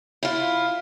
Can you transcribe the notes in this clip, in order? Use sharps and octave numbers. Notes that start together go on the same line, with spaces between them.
E4 F4